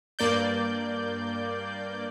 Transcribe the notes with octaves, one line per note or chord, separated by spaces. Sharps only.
G2 A#3 D5 G6